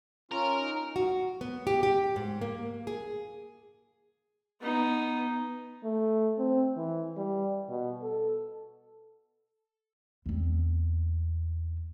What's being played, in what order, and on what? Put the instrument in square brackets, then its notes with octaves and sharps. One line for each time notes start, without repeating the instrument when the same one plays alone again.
[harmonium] C#4 F4 [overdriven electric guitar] A#4
[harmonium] D#4
[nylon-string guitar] F#4
B3
G4
G4
G#2
A#3
G#4
[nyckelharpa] B3 D#4
[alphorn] A3
C4
E3
G3
B2
A4
[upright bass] E2 C4